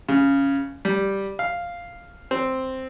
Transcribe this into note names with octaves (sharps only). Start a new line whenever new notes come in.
C#3
G3
F5
C4